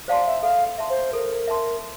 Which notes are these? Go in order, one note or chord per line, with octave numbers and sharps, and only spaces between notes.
C5 D5 F5 A5 C6
E5
A4 F5
E5 A5 C6
C5
A4 A#4
E5 A5 C6